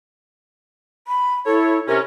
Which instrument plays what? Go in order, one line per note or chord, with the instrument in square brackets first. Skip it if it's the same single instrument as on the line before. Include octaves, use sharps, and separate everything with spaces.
[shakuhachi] B5
[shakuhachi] E4 [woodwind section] A4 C#5
[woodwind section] C3 C#4 [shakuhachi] A#4